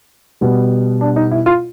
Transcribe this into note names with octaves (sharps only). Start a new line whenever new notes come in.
B2 G3 B3
D4
D#4
E4
F4